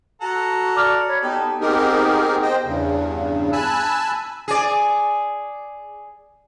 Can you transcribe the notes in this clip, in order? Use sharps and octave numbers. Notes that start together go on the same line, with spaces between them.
F#4 A4 F#5 A#5
D5 D6 F6 F7
C#5 B5
B3 D#4 G4 A4
B3 C4 D#4 G4 G#4 A#4
C5 D#5 G5
E2 G2 C#3
G#5 A5 B5 E6 F#6
G#4 D5